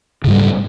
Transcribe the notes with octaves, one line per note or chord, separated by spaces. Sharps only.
G#2 C#3 G3